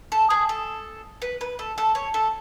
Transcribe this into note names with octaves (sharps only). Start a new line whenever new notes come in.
A4
G#4
A4
B4
B4
A4
A4
C#5
A4